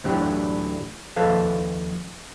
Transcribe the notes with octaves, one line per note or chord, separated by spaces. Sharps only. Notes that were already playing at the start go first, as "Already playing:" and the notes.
D2 A2 E3 F#3 D4 G4
D#2 F3 A4 B4 F5